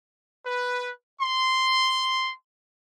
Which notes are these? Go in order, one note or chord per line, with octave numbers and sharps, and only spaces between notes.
B4
C6